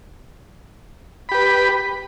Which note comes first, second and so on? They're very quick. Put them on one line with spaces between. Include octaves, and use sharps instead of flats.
B5 G4 B4